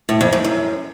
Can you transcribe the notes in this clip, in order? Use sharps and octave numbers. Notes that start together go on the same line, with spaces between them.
A2
F2
G#2
F#2